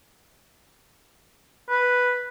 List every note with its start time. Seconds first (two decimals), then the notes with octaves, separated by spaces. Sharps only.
1.70 B4